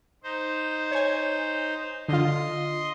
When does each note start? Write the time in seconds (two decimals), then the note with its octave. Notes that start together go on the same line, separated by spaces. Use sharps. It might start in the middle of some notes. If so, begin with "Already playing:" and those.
0.24 D#4 C5
0.91 C#5 G#5
2.08 D3 F4 D#5 C6